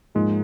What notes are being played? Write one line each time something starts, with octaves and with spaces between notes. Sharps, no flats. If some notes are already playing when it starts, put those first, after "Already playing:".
G#2 F3 G#3 A#3 D#4 G#4